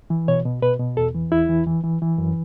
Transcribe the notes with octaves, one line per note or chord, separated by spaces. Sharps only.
E3
B2 C#5
B2
B2 B4
B2
E2 A4
E3
E2 E4
E3
E3
E3
E3
F#2